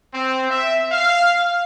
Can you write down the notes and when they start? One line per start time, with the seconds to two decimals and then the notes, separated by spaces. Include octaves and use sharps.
0.14 C4
0.50 E5
0.92 F5